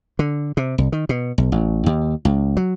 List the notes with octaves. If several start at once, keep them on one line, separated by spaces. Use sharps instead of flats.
D3
C3
C2
D#3
B2
B1
A1
D#2
C#2
F#3